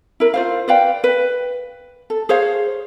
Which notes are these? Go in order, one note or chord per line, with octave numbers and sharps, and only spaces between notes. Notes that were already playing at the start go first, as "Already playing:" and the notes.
E4 A#4
F4 C5 F5
B4 D5 F5 G5
B4
A4
G#4 C5 C#5 F5